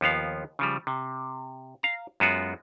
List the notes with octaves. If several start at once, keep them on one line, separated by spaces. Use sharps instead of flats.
D#2 F3 B3 F5
C#3 F3 G3
C3
F5 A#5
F#2 G#3 B3 F4 F#4